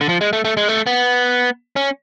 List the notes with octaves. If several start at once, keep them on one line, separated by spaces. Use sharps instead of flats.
D3
F3
G#3
A3
A3
G#3
A3
B3
C#4